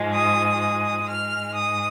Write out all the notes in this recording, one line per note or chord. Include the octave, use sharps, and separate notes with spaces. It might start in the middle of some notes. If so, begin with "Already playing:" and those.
Already playing: G#2 F3 G#3
D#6
D#6
G#2 G#3 F6
D#6